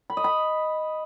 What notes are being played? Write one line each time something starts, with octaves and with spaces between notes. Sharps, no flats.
B5
D#5
B5